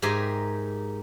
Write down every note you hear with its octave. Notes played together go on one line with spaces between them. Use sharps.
G#2 G4 G#4 A#4 E5 G#5